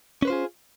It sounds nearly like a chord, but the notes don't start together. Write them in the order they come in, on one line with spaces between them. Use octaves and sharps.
C#4 B4 C5 F4 G#4